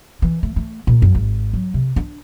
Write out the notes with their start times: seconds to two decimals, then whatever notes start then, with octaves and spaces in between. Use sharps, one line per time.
0.22 E3
0.43 A3
0.56 A3
0.87 A#2
1.02 F#2
1.15 G#1
1.53 F#3
1.74 C3
1.96 D4